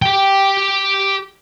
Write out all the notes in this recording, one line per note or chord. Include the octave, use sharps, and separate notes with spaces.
G4 G5